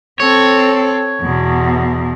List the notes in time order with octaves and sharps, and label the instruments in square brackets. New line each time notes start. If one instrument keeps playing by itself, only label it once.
[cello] C4 A4 [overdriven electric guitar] C#5
[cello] E2 B2